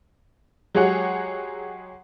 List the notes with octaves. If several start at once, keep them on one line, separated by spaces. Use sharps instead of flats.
F#3 G#3 G4 G#4 C#5 F#5